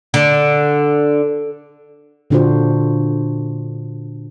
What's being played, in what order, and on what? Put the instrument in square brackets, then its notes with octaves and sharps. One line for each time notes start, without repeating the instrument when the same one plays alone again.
[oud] D3
[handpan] A#2 D3 D4 F4 F#4 C5